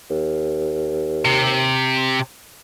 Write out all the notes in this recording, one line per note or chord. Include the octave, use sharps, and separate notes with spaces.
D#2
C3